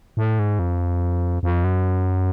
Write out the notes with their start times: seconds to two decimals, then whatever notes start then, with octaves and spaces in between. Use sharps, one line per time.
0.17 A2
0.39 G#2
0.59 F2
1.43 F2
1.64 F#2